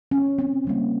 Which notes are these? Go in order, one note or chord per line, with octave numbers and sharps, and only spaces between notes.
C#4
C4
C#3 G3 A#3